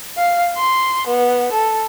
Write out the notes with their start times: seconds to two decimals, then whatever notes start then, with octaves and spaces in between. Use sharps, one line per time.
0.18 F5
0.56 C6
1.07 B3
1.52 A4